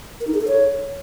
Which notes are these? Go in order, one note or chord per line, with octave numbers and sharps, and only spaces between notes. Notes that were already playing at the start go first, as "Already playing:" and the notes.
A#4
D#4
G#4
A4
C#5